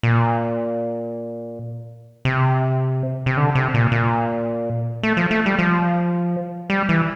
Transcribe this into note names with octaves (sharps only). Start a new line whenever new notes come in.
A#2
C3
C3
D3
C3
A#2
A#2
A3
F3
A3
G3
F3
G3
E3